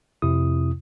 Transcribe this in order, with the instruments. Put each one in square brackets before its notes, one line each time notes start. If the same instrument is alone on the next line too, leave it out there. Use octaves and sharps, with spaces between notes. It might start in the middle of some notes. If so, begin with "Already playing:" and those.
[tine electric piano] F2 C3 E4 D#6